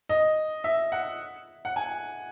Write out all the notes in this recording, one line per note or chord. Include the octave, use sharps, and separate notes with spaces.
D#5
E5
F#5
F#5
G#5